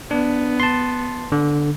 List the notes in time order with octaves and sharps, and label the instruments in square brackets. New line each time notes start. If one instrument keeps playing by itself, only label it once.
[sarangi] B3 [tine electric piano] D4
[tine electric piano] A5 C6
D3